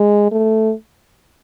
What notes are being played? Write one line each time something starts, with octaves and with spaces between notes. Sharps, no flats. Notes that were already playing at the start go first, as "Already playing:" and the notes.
Already playing: G#3
A3